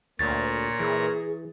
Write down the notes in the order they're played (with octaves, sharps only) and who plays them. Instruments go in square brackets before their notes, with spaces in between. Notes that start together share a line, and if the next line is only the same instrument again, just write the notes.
[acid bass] D2 [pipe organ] A#2 C#5 A#6 [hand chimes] A6
[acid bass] E3 [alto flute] G#4